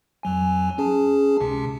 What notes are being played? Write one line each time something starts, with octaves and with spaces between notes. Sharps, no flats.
F2 F#3 G#5
C#4 G#4 A5
C#2 C3